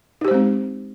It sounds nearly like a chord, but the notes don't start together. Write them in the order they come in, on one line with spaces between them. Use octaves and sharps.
D#4 G4 C5 G#3 C4